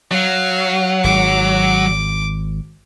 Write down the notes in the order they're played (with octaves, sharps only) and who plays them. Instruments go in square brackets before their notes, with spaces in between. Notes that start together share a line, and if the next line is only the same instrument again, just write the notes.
[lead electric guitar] F#3 [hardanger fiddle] F5
[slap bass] G#1 [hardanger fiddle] D6